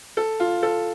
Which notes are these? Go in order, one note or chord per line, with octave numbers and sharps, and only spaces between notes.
A4
F4
A4